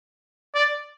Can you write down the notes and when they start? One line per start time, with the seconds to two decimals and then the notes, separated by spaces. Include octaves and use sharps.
0.55 D5